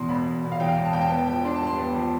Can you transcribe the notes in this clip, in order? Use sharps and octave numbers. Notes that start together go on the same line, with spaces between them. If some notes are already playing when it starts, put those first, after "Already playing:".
Already playing: E2 B2 C6
E1 B5
E1
B2
F5
E2 G5
F5
E1 G5
A5
E1 G5
A5
B3 G5
A5
F3 G5
D4 C6
A5
G2
C6
B3
F3